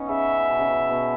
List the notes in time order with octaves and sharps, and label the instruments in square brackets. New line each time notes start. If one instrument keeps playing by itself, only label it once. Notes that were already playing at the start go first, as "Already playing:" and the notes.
Already playing: [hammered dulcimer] B3 C#4 D#4
[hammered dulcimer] C#3 [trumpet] E5
[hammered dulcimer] B2
C#3
B2
B2